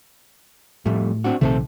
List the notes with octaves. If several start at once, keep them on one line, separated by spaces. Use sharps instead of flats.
F2 A2 G3 A3
C4 D4 F#4
A#1 C3 D#3 A3 C4 A4